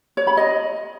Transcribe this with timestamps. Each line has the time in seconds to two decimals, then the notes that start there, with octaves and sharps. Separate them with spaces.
0.17 C#5
0.27 B5
0.37 D#5